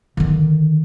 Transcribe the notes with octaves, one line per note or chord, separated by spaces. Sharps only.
D3 D#3